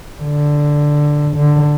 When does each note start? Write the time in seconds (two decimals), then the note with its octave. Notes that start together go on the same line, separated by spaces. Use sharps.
0.23 D3
1.37 D3